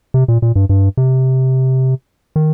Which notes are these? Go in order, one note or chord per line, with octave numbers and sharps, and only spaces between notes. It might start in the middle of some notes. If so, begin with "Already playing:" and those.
C3
A#2
A#2
G2
G2
C3
D#3